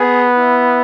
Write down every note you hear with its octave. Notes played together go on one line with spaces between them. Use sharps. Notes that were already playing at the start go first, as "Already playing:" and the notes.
Already playing: B3 G#4
E4